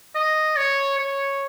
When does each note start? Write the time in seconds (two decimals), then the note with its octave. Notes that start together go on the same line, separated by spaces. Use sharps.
0.15 D#5
0.57 C#5
0.99 C#5